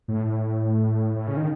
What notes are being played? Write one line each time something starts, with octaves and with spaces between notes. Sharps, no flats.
A2
A2
C#3
D#3